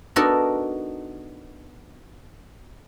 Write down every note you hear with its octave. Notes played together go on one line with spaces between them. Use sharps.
B3 D4 D#4 F#4 A4 A#4